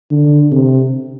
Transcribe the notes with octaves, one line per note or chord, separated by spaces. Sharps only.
D3
C3